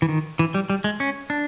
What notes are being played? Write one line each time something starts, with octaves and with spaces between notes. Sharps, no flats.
E3
D#3
E3
G3
G3
G#3
C#4
D4